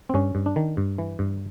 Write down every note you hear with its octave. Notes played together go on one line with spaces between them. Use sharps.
C4
G2 C#4
G2
D4
D#3
G2
E3
G2